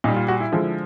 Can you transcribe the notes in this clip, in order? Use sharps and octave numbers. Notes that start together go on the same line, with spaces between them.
A#2 G3 D#4
F4
F#4
E4
D3 F3 G#3